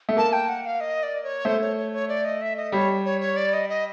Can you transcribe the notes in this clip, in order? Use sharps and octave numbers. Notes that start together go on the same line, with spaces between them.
A3
A#3 A5
G5
F#5
F5
D#5
D5
C#5
A3 C5
C#5
C#5
C#5
D5
D#5
E5
D#5
G3 C#5
C#5
C#5
D5
D#5
D#5